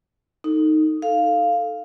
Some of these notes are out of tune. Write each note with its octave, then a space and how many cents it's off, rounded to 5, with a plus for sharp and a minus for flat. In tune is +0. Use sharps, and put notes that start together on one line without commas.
D#4 +0 A4 +15
A4 +0 F5 +0